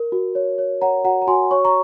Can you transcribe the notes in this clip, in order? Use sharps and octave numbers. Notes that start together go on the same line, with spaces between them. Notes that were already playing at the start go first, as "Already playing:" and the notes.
Already playing: A#4
F#4
C#5
C#5
C#5 F#5 A#5
F#4 F#5 A#5
A#5
F#4 G#5 C6
C#5 C#6
A#5 C#6